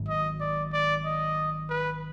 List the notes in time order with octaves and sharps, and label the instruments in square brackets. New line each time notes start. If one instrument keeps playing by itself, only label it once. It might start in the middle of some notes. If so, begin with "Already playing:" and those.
Already playing: [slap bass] G#1 G#2 D#3 F#3
[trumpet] D#5
D5
D5
D#5
B4